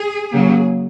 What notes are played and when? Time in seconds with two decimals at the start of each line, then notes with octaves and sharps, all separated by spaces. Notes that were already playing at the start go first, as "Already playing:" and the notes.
Already playing: G#4
0.32 C#3 F#3 A#3